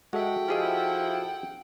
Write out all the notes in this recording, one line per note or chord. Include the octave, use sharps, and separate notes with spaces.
G#3 F#4 A4 E5 F#5 G5
F3 E4 G4 G#4 D#5